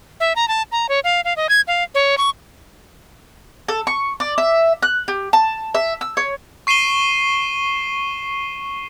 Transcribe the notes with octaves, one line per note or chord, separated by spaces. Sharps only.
E5
A#5
A5
A#5
C#5
F5
F5
D#5
G#6
F5
C#5
C#6
A4
C#6
D5
E5
F#6
G4
A5
E5
E6
C#5
C#6 C7 D#7 E7 G7